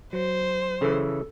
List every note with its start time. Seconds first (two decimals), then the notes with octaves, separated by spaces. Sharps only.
0.13 F#3 C5
0.81 C#3 E3 A4